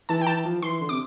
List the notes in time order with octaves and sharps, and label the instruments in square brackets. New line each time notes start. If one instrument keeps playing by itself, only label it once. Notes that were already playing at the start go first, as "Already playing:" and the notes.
[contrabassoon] E3 [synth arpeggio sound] A5
[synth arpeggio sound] G5
[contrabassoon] E3 [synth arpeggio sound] A5
[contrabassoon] F3
[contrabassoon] E3 [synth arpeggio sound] C6
[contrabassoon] D3
[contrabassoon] C3 [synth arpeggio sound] D6